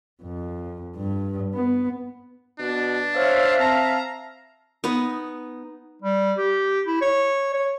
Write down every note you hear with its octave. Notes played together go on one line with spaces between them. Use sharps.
F2
G2
B3
B2 D4
C5 C#5 E5 F5
C4 A5 A#5
B3 D#4
G3
G4
E4
C#5
C#5